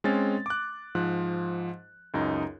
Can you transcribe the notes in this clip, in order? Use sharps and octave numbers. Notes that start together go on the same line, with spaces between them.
G#3 C4 C#4 G#5 A6
D6 F#6
G#2 F3 F#6
C#2 F#2 D#4